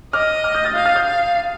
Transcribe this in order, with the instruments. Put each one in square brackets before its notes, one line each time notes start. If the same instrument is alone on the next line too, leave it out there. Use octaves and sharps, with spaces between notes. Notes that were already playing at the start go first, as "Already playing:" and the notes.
[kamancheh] D#5 [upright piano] D6 F6
[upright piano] D6 F6
D#6 G6
F6 A6
[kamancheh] F5 [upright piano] D#6 G6
[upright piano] F6 A6
D#6 G6
[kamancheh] F5